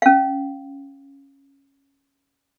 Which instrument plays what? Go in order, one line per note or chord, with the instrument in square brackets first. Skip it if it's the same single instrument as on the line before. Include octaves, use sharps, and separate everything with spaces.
[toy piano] C#4 F5